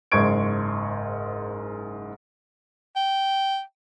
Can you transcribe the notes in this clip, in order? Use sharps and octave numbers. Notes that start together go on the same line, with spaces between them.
F#1 G#2 C5 C#6 G#6 D7
G5